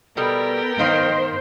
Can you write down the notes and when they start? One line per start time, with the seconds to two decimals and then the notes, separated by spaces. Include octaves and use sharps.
0.17 B2 G3 B3 A4 A#4 G5
0.79 D#3 C5 D#5 F5